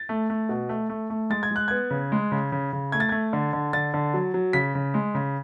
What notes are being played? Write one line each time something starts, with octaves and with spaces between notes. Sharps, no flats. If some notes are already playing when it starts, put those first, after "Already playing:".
Already playing: A6
A3
A3
B2
A3
A3
A3
G#3 A6
G#6
G#3 F#6
B3 G#6
C#3
G#3
C#3
C#3
C#3
A3 G#6
A6
A3 G#6
D3
D3
D3 A6
D3
F#3
F#3
C#3 B6
C#3
G#3
C#3